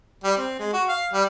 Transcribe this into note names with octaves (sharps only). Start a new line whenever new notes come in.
G3
C4
G#3
F#4
F5
G3